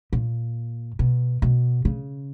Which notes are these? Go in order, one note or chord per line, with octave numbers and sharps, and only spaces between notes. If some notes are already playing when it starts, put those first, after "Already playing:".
A#2
B2
B2
C#3